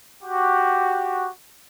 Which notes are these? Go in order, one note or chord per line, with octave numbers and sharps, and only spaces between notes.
F#4 G4